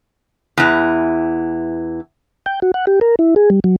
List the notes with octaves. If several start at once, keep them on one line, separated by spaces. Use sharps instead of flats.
E2 E3
G5
F#4
F#5
G4
A#4
E4
G#4
G3
F#3